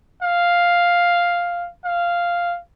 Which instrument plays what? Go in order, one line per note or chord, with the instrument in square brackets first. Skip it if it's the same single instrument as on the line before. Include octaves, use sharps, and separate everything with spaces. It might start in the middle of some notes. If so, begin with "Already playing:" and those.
[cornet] F5
F5